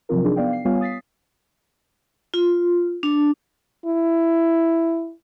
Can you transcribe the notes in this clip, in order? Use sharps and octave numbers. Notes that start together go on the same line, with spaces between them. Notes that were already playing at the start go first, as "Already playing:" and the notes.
C3 F3 F#3 C4 F4 A#4
D4 D#4 G#4
B3 D5 F5 G5
C7
G3 B3 F4 C#5 F5 G#5
D#6 A6 B6 C7
F4
D4
E4